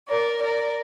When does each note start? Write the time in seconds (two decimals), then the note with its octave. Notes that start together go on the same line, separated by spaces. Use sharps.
0.09 A#4 D5
0.41 A#4 D5